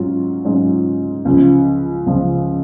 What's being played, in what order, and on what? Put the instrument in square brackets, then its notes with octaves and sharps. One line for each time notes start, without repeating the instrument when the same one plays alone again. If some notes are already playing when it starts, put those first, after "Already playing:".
Already playing: [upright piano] G#2 F#3 C#4 F4
G#2 F#3 C#4 F4
C#2 C#3 F3
C#2 C#3 F3